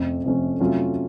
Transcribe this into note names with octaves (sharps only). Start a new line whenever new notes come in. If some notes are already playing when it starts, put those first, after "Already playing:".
Already playing: F2 C3 F3 A3 C#4
F2 C3 F3 A3 C#4
C3 F#3 A3 C#4 F4